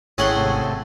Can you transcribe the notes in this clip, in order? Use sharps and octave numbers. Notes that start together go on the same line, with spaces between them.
G#1 A2 C#4 G#4 A4 F#5 C6
C3 A3